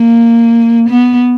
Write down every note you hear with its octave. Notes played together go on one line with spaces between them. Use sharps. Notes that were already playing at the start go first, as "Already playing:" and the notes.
Already playing: A#3
B3